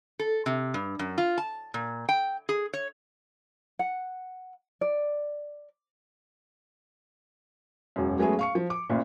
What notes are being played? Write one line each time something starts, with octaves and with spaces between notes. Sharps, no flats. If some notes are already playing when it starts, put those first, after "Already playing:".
A4
C3
G2
F#2
F4
A5
A#2
G5
G#4
C#5
F#5
D5
E1 F#2
F#3 G#3 A3 B3 C#4 G#4
F5 C#6 C#7
F3
D6
A1 A#2